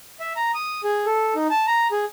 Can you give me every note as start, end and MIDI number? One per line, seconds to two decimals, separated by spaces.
0.20 0.33 76
0.36 0.51 82
0.55 0.81 87
0.84 1.06 68
1.06 1.34 69
1.36 1.48 63
1.50 1.66 81
1.67 1.88 82
1.92 2.05 68